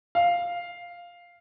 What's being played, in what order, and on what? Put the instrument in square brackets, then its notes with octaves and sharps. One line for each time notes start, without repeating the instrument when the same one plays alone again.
[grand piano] F5